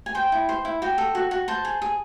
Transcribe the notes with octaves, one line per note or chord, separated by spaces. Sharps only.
G#5
C5 G5
E4
C5
E4
F#4 G5
A4
F#4
F#4
C5 A5
G#4
G#4